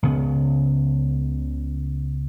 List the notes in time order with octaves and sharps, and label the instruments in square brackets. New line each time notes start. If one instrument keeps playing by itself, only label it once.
[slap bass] C#2 C#3 B3